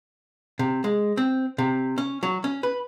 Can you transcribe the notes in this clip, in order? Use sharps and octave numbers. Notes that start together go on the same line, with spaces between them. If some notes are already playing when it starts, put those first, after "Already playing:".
C3
G#3
C4
C3
C#4
F#3
C#4
B4